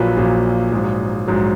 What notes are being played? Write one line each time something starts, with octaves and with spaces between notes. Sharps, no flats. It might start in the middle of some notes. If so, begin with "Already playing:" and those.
Already playing: A#1 A#2 F#3 B4
A#1 A#2 F#3
A#1 G#2 F#3
A#1 G#2 F#3